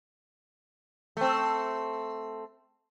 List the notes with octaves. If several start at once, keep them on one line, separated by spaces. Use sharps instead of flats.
A3 C4